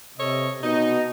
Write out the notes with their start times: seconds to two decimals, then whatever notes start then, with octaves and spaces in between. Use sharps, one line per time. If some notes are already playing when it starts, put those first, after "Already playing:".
0.18 C3 A4 C#5 D#5
0.62 B2 D#4